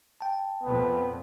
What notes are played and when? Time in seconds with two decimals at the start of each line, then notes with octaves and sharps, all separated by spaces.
0.21 G5 A5
0.64 F2 A#2 B3